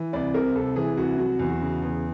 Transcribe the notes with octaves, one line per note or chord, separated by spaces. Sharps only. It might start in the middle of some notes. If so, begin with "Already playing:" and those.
Already playing: E3
C2 D5
C3 A#4
C2 A4
E3 G#4
C2 F#4
F#3 F#4
E2
F#4
C#3
E2